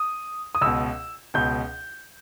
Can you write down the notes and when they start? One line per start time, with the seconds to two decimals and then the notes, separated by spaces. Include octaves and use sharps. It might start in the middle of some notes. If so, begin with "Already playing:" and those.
Already playing: D#6
0.55 D#6
0.61 C#2 B2 E6
1.34 C#2 B2 G6